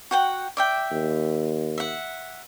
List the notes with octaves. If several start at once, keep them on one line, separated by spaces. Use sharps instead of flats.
F#4 F#5 G5
D5 E5 G5
D#2
E5 F#5